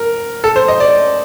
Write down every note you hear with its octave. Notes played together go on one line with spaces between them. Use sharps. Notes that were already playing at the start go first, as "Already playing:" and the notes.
Already playing: A#4
A4
C5
D#5
D5